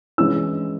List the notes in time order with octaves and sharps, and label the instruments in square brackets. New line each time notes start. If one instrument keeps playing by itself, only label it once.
[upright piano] E3 G#3 C#4 E4 E6